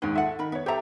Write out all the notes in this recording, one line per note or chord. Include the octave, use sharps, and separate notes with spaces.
D#2 G#2 D4
F4 A4 E5 F#5
D#3 A#4 E5 B5
B3 C#5 E5
G4 A4 C5 E5 A#5